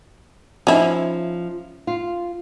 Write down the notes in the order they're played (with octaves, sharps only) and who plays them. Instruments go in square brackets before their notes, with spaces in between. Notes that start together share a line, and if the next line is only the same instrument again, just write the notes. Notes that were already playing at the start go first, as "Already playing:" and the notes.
[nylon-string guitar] F3 D#4 [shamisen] C#4 E4
[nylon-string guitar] F4